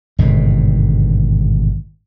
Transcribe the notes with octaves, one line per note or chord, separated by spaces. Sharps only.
G#1 G2 B2 D3